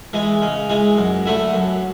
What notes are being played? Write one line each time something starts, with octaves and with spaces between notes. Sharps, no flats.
E3 G#3
C#3
E3 G#3
F#2
D3 A3 E4
F#2